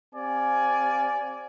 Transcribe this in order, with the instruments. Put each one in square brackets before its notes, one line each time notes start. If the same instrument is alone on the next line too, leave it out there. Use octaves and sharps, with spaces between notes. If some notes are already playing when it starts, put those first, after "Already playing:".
[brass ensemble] C4 G4 D5 F5 G#5